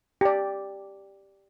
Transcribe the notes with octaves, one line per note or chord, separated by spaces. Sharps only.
G4 D5